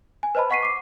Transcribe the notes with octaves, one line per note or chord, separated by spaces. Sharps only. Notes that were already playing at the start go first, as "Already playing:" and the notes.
G#5
B4 C5 D#5 A5 B5
D#5 F#5 C#6 B6 C7 D#7
D6 C7